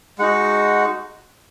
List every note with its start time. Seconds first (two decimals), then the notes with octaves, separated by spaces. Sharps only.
0.19 G#3 D#4 F#4 F#5